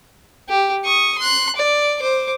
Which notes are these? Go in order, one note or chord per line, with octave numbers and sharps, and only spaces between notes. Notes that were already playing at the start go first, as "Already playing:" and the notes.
G4
C#6 D#6
C6 F#6
D5
C5 D6